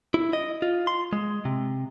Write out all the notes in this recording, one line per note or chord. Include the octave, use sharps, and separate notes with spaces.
E4
D#5
F4
C6
G#3
C3